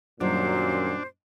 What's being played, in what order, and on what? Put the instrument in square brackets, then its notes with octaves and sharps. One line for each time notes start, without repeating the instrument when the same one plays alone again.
[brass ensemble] F#2 A#2 [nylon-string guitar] D#3 F#3 G3 [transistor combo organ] D4 [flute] C5